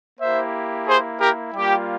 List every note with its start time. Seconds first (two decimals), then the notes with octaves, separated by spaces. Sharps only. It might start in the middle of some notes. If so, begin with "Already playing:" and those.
0.20 A#3 E4 G4 C5 E5
0.87 G#4 C5
1.20 G4 A#4
1.54 G3 A#3 F4 G4